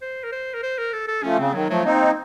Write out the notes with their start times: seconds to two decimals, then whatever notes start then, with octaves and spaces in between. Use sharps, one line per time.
0.02 C5
0.24 A#4
0.32 C5
0.54 A#4
0.63 C5
0.78 A#4
0.93 A4
1.08 A4
1.23 F3 A3 C#4
1.38 C#3 C4
1.54 D#3 F#3
1.69 F3 F#3 A3
1.84 A#3 C4 D#4